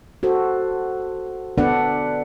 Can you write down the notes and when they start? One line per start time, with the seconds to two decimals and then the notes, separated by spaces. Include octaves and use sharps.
0.23 F#4 A4 C5
1.58 B3 D4 A4 B4 D5 F#5